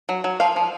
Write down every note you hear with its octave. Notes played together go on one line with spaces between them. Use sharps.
F#3
F#3
F3 F5
F3